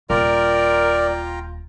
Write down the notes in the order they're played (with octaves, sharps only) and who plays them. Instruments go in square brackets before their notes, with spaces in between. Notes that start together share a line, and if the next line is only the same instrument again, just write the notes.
[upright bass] D#1 [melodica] F4 G5 A#5 [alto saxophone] A#4 [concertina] D5